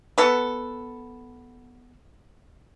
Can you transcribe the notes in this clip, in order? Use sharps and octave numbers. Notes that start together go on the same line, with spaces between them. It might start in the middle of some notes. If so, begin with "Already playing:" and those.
B3 A4